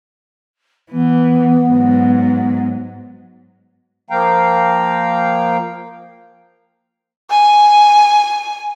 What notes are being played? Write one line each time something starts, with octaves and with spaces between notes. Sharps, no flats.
E3 B3
G#2 F#3
F3 A#3 F5 G5 A#5
G#5